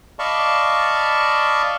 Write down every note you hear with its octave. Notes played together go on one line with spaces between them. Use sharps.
D5 D#5 F5 A5 B5 C#6